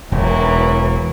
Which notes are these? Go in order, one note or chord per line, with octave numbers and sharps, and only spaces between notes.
E1 E3 F#3 A#3